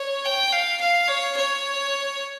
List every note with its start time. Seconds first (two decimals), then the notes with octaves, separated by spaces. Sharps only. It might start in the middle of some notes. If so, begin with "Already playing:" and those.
Already playing: C#5
0.25 G5
0.53 F5
0.81 F5
1.08 C#5
1.37 C#5